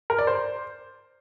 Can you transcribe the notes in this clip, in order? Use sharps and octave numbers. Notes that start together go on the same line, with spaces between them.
A#4
D5
C5